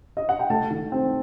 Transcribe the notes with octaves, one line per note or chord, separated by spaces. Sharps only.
D#5
F#5
G5
A3 A5
D#3
C4